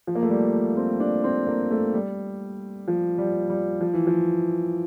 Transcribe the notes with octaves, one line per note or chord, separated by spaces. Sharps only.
F3
A#3
A3
G3
C4
D4
C4
A#3
A3
G3
F3
G3
G3
F3
E3
F3